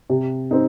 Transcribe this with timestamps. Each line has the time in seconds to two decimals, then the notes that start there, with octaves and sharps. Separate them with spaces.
0.10 C3
0.51 C4 D#4